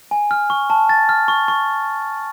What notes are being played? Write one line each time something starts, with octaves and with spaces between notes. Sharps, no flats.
G#5
F6
C#6
A5
A6
F6
C#6
C#6